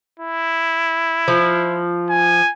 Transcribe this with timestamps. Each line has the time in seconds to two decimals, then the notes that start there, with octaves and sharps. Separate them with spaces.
0.20 E4
1.28 F3
2.10 G#5